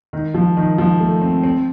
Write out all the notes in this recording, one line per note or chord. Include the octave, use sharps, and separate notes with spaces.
D#3
F3
D#3
F3
A3
C4
C4